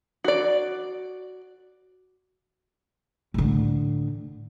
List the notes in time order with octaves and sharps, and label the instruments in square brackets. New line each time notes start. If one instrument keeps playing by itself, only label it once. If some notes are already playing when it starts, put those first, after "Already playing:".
[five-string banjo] F#4 D5
[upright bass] A2 D3